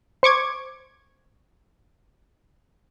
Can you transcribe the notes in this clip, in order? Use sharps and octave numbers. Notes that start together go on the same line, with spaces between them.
C5 C#6 D6 G#6